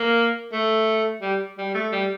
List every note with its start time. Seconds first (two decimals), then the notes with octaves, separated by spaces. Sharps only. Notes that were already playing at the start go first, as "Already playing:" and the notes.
Already playing: A#3
0.53 A3
1.22 G3
1.58 G3
1.75 A3
1.92 G3